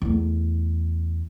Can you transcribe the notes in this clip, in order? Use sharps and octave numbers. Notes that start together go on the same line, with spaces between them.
E2 A3